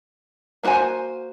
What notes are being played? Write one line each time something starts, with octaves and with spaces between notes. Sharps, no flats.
A#3 C#4 F#4 C5 G#5